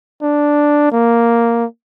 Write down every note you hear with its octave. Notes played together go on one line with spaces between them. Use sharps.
D4
A#3